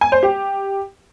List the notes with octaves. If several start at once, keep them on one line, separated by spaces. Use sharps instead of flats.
G#5
C5
G4